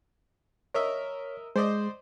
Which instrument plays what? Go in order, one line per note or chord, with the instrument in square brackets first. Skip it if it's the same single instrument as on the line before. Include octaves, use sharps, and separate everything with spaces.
[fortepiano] A#4 D#5 E5 [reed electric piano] C#5
[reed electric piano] G#3 [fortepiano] C5 D5 D#5